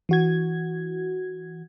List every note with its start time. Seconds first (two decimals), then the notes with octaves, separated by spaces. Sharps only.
0.09 E3 F#4 G#6